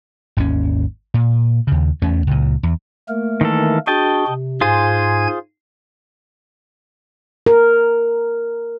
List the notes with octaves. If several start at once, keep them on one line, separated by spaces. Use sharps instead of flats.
G#1 D#2 D3 C#4
A#2
D#2 C#3
E2 A3 C#4
C#2 A#2
E2
A3 A#3 A#4
D#3 E3 A4
D4 F#4 G#4 D#5 G5 A5
C3
G#2 F4 G#4 C5 G#5 G#6
A#4